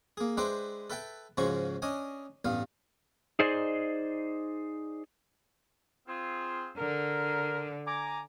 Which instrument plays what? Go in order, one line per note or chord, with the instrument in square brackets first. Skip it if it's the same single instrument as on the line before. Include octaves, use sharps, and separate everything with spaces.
[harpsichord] A#3 G#4
G#3 D4 B4 C5 E5 G5
A4 B4 E5 G5 A5
G#2 C#3 F3 G#3 F#4 C#6
C#4 D4 D#5 G#5
A1 G2 B3 F5
[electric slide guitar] D#4 G#4 C5 D5 D#5
[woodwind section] C4 F4 G#4
[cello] D3 [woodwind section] A#4 F6
[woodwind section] G#5 A#5 D6